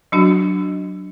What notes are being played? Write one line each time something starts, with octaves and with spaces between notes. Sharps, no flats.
F#3 D4 F#4